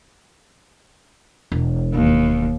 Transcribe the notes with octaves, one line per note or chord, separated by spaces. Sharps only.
E1
D#2